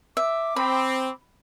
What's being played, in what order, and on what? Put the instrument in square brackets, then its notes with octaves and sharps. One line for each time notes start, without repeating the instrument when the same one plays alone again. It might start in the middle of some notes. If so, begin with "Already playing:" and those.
[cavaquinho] E5 [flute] D6
[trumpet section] C4 [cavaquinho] B5